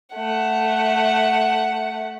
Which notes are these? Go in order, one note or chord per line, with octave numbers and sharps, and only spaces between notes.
A3 F#5